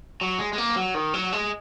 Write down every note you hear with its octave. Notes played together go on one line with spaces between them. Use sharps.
F#3
G#3
G#3
A#3
F#3
D#3
F#3
G#3